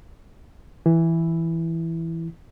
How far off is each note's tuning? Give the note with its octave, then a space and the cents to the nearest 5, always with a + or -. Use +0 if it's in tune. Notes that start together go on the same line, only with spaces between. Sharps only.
E3 +0 E4 +0